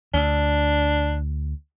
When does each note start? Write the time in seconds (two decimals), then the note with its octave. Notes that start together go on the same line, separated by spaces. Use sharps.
0.14 D2 D4